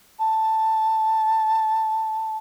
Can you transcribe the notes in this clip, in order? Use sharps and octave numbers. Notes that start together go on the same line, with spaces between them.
A5